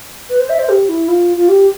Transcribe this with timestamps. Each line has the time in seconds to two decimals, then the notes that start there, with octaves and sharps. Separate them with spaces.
0.30 B4
0.40 C5
0.50 E5
0.59 C5
0.69 G4
0.89 E4
1.08 F4
1.37 F4
1.49 G4